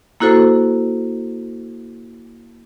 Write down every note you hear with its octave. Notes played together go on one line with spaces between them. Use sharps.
A#3 E4 F#4 A4 C5